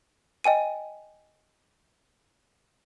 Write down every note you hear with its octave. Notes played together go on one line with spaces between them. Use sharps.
D#5 G5 G#5 D#7